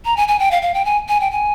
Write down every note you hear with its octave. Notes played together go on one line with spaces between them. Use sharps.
A#5
G#5
G#5
G5
F5
F5
G5
G#5
G#5
G5
G#5